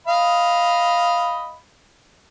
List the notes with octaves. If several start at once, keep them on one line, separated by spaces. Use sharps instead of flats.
D#5 F5 B5